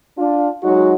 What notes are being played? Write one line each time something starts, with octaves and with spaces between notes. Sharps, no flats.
D4 F4
F#3 G#3 D#4 F#4